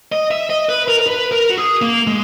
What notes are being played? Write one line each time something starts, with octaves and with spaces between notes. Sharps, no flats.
D#5
E5
D#5
B4
A#4
A#4
B4
A#4
F#4
G#4
A#3
G#3